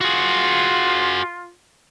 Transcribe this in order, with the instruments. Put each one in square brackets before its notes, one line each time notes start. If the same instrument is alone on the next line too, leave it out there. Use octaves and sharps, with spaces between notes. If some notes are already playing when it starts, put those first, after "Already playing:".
[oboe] F4 [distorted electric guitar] F#4 G#4